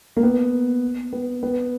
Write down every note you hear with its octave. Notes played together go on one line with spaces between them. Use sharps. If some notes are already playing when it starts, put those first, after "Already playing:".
A#3
B3
B3
B3